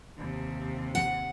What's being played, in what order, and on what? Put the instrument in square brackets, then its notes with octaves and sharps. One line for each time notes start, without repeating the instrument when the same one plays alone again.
[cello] D#2 C3
[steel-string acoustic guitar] F#5